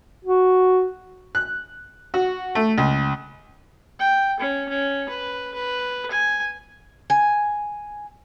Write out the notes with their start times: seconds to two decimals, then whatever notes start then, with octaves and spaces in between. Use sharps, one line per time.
0.25 F#4
1.35 F#6
2.14 F#4
2.55 A3
2.78 C#2
3.99 G5
4.40 C#4
4.69 C#4
5.09 B4
5.54 B4
6.11 G#5
7.10 G#5